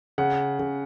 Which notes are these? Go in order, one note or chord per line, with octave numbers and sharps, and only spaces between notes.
C#3 F#5
C#3